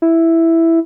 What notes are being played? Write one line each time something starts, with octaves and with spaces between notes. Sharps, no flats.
E4